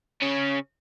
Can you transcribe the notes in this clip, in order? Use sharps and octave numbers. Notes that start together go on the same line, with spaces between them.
C#3 C#4